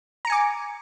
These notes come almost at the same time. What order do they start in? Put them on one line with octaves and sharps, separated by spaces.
A#5 C#7 G#5 D6